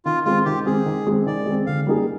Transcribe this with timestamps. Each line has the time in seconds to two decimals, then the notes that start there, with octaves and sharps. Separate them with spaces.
0.05 D#3 F4
0.25 G#3 C4 F4
0.45 D#3 G4
0.66 G#3 C4 G#4
0.86 D#3
1.07 G#3 C4
1.26 D#3 D5
1.46 G#3 C4
1.66 D3 F5
1.87 G3 A#3 D#4 G#4